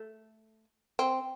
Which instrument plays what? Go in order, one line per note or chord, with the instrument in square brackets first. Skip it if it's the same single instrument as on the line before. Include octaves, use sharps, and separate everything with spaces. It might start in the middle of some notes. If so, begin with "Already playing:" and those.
Already playing: [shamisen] A3
C4